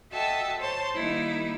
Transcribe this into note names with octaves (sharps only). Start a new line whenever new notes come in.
F#4 A4 D#5 E5 G5 A5
C5 C#5 A5 C6
D#3 G3 A#3 D#4 E4